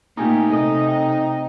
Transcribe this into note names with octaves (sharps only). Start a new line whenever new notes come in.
A#2 A3 C4 D#4 G4 G#5 G6
C3 A4 D#5 D#6
G5